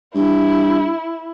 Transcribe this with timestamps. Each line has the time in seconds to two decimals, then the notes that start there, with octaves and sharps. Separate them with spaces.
0.15 G2 E4